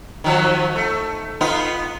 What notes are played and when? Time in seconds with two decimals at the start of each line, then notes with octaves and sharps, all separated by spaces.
0.24 D#3 F3 F#3
0.76 A3
1.41 B3 D#4 F4